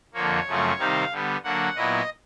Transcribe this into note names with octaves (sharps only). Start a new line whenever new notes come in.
F2 D3 F3 A#3 C#5
F#2 C#3 F3 A3 C4
C3 D#3 G3 C4 D#4 F5
D3 G3 B3
D3 F#3 A#3 D4 F#5
A#2 F#3 B3 E4 D#5